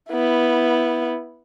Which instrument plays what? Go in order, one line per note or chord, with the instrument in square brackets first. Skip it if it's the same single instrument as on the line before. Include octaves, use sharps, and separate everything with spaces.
[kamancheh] B3 E4